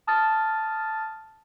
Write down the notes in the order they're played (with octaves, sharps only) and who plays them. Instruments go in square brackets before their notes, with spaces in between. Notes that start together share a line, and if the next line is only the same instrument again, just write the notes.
[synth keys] A5 D#6 F6 A6